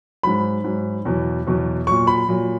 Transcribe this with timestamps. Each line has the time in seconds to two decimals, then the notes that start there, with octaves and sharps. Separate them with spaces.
0.23 G#2 F#3 B5
0.64 G#2 F#3
1.05 E2 B2 F#3
1.47 E2 B2 F#3
1.87 A#2 F#3 C#6
2.07 B5
2.29 A#2 F#3